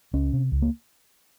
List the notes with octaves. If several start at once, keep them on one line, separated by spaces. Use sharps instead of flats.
C#2 C#4
C3
C#2
A#3